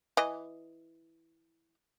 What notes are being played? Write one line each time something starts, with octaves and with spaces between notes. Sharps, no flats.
E3 D#5